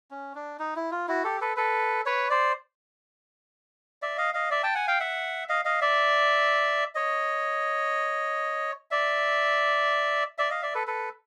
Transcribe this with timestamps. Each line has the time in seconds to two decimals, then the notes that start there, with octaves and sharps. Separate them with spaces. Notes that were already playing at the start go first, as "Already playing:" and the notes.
0.11 C#4
0.35 D4
0.59 D#4
0.76 E4
0.92 F4
1.08 E4 F#4
1.24 G4 A4
1.41 A4 B4
1.56 A4 B4
2.06 B4 C#5
2.30 C5 D5
4.02 D5 E5
4.18 D#5 F5
4.34 D#5 F5
4.51 D5 E5
4.63 G5 A5
4.75 F#5 G#5
4.88 F5 G5
5.00 E5 F#5
5.49 D#5 F5
5.65 D#5 F5
5.81 D5 E5
6.95 C#5 D#5
8.91 D5 E5
10.38 D5 E5
10.50 D#5 F5
10.62 D5 E5
10.74 A4 B4
10.87 A4 B4